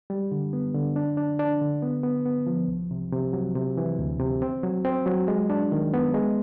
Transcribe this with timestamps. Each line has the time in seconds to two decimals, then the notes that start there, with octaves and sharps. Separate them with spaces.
0.10 G3
0.32 D3
0.53 B3
0.75 D3
0.96 D4
1.17 D4
1.39 D4
1.61 D3
1.82 B3
2.03 B3
2.26 B3
2.47 F3
2.68 C2
2.91 C3
3.12 C3
3.33 F#3
3.55 C3
3.77 E3
3.99 D2
4.20 C3
4.42 C4
4.63 F#3
4.85 C4
5.06 F#3
5.28 G#3
5.50 D4
5.72 D#3
5.94 B3
6.14 G#3